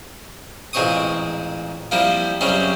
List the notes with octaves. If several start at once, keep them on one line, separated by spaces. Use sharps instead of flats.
A1 A#2 G#3 C4 C#6 D#6
F3 G3 A#3 C4 E4
F#2 C#3 G3 C4 C#4